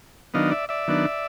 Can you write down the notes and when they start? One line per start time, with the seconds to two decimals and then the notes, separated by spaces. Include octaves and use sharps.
0.34 D#3 F#3 B3 D4 D#5 F5
0.51 D5 E5
0.69 D5 E5
0.88 D#3 F#3 B3 D4